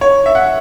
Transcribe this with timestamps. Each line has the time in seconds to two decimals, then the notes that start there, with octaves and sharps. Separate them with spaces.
0.01 C#5
0.26 E5
0.35 F#5